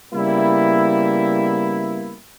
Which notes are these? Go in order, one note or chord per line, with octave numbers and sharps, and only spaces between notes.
C#3 G3 A#3 B3 E4